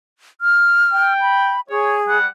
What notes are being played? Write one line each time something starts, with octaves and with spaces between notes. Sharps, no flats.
F6
G5
B5
G#4 C#5
G3 F#5